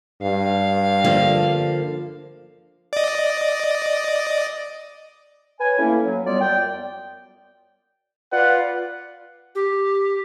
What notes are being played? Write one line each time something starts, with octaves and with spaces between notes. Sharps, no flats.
G2 F5
D3 F3 A#3
D5 D#5
B4 C#5 G#5
A3 A#3 C#4 E4
F#3
F#3 G3 B3 F4 D5
F#2 D5 G5
F4 B4 D5 F#5
G4